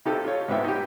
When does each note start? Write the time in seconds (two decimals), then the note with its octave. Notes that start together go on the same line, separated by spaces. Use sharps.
0.05 C3 D#4 F4 G4 A4
0.24 F4 C#5
0.48 G#2 C3 B3 E5 G5
0.64 D#4 G4